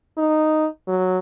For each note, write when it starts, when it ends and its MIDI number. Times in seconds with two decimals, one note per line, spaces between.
0.18 0.67 63
0.88 1.18 54